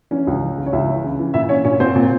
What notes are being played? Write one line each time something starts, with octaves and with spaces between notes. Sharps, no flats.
E3 C#4 C#5
C#2
E3
C#3
C#5
C#2 E4 E5
E3
C#3
E3
A#2 E4 E5
C#4 C#5
A#2 C#4 C#5
A#2 C4 C5
A#2